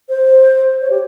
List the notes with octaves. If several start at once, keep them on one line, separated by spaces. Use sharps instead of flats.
C5
C#5
G4